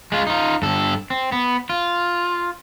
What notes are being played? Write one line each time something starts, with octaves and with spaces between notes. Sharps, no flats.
G#3 F4
D#4 F4
G2 A4
C4
B3
F4